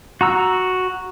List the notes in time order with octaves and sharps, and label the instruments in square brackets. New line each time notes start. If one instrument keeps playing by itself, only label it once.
[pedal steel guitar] F#4 A#5 E6